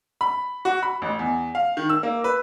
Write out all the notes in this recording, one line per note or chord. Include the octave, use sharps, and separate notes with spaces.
B5
F#4
B5
A1
E2
F5
D#3
E6
A#3
B4